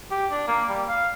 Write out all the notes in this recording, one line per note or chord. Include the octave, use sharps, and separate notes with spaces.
G4
D4
A#3
G3
F5